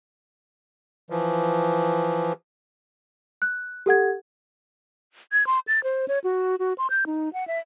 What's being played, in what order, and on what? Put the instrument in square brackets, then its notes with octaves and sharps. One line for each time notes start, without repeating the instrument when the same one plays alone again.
[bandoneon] E3 F3
[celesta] F#6
G4 A4 F#5 G#6
[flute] G#6
C6
A6
C5
C#5
F#4
F#4
C6
G6
D#4
F#5
E5